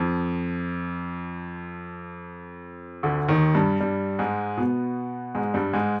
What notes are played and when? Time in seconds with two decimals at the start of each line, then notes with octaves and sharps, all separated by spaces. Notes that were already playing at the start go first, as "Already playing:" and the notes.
Already playing: F2 F3
3.03 D2 D3
3.28 D#2 D#3
3.54 G2 G3
3.80 G2 G3
4.19 G#2 G#3
4.57 B2 B3
5.35 G#2 G#3
5.54 G2 G3
5.73 G#2 G#3